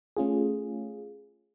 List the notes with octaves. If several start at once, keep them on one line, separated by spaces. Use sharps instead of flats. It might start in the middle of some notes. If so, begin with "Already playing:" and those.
A3 C#4 F4 G#4